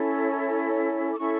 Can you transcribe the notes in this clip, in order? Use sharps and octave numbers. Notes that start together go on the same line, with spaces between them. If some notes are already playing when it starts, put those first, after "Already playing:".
Already playing: C#4 E4 A4 C#5
D6
C#4 E4 A4 C#6